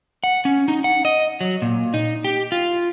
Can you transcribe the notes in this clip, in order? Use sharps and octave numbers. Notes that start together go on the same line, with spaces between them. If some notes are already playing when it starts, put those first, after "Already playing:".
F#5
C#4
D#4
F#5
D#5
F#3
A#2
D#4
G4
F4